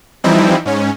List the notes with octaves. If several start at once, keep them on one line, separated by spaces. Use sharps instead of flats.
E3 F3 G3 C4 D#4 E4
G#2 C#4